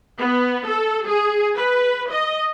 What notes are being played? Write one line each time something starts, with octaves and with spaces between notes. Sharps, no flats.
B3
A4
G#4
B4
D#5